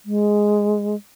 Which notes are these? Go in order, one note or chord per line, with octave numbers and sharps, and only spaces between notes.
G#3